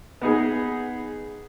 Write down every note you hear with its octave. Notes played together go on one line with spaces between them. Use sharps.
B3 D#4 G#4